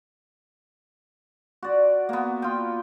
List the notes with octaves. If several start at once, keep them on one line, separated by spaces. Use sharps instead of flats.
F#4 D5
A#3 B3
F4 G5